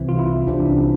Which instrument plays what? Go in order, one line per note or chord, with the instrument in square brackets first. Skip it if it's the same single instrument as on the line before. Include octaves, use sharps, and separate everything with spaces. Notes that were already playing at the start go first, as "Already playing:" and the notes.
Already playing: [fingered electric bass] C2 C3 E3
[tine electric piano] F4
E4
[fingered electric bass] C2 C3 E3 [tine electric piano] D4
[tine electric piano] D4
C#4